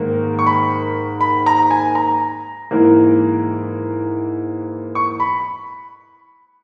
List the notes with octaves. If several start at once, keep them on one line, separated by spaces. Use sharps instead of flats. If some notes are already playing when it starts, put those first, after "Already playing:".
Already playing: G#2 D#3 A#3
C#6
B5
B5
A#5
G#5
A#5
G#2 E3 A#3
C#6
B5